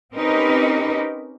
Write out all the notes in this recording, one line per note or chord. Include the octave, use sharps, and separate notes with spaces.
C4 C#4 D#4 G4 A#4 B4